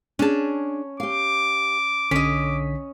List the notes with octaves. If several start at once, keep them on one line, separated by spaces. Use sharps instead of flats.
C#4 D4 G#4 A5
G4 F5 D6
B1 D3 C#4 C#5 D#5 B6